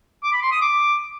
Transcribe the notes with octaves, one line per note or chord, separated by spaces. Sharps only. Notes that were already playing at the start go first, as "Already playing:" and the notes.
D6
B5
C6
D#6
D6